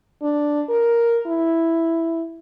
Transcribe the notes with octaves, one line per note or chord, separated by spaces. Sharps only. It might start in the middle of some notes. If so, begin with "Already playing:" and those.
D4
A#4
E4